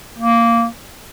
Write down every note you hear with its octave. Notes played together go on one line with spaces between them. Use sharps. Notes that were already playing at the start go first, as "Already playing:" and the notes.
A#3